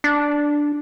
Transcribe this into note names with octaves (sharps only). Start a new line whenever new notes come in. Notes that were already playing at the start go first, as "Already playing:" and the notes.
D4